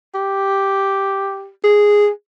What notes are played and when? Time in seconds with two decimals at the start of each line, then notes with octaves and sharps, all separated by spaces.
0.15 G4
1.64 G#4